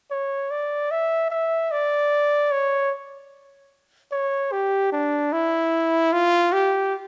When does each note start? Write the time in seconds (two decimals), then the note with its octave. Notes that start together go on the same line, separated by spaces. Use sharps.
0.11 C#5
0.51 D5
0.91 E5
1.31 E5
1.71 D5
2.52 C#5
4.12 C#5
4.52 G4
4.93 D4
5.32 E4
6.13 F4
6.52 G4